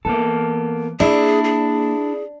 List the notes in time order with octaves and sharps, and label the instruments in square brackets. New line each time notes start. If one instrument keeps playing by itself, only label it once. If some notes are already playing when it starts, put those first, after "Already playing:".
[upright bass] E3 [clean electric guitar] A#3 B3 A4
[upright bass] A#3 [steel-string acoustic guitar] D4 [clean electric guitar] E4 E5 [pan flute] G#4
[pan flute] G#4